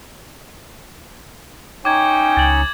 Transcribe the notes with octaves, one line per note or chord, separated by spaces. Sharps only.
C#4 D#4 C#5 G5 D6 G#6
C#2 A6 F#7